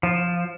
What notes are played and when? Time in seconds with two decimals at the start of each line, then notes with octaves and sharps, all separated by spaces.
0.03 F3